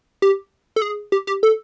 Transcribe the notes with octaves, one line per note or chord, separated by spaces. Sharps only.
G4
A4
G#4
G4
G4
A4